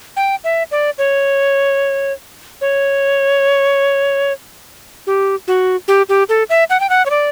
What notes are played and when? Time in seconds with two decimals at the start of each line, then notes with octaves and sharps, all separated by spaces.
0.16 G5
0.44 E5
0.71 D5
0.98 C#5
2.61 C#5
5.07 G4
5.48 F#4
5.88 G4
6.09 G4
6.29 A4
6.50 E5
6.70 F#5
6.80 G5
6.90 F#5
7.06 C#5
7.10 D5